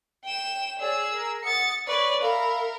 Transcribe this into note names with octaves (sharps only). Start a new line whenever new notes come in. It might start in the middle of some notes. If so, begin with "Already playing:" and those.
G5 E7
G#4 C#5 D5 E6
A#4
F#5 D#6 A6 C#7
B4 C#5 D5 C#6
A#4 E5 F5 B5